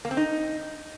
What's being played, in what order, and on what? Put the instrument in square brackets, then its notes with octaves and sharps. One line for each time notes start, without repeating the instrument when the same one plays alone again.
[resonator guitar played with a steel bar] A#3
C4
D#4